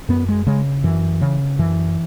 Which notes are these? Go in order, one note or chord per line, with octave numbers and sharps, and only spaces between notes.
F#2 B3
G#3
C#3 G#3
F#2 E3
C#3
F#2 E3